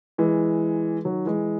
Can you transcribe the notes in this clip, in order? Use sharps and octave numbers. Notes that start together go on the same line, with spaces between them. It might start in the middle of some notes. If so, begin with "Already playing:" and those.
E3 G#3
D#3 F#3
E3 G#3